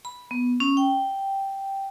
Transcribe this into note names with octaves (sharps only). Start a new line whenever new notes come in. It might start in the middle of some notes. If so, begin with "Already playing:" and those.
B5
B3
C#4
G5